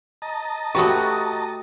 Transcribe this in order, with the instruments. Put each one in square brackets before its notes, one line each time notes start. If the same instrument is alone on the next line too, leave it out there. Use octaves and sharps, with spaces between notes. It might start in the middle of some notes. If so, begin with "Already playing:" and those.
[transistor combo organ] D#5 A5 A#5
[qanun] A3 F#4 B4 [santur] G4 [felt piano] C#6 D#6